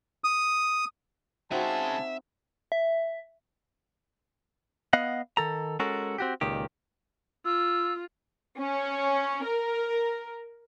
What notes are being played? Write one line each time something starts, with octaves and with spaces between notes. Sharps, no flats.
D#6
C#3 G#3 C4 D#4 F#4 E5 G#5 A5
E5
B3 D#5 F5 F#5
D#3 A4 A#5
G#3 C#4 F#4 A4 A#4
C4 F#4 G4
C#2 A#2 D#3 G4
F4 E6
C#4
A#4